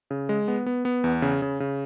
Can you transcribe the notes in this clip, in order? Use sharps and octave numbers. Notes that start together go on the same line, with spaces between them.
C#3
G#3
B3
B3
B3
E2
C#3
C#3
C#3